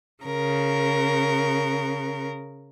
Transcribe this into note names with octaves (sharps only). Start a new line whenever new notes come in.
C#3 A#4